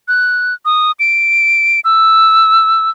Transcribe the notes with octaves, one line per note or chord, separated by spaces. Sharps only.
F#6
D#6
D7
E6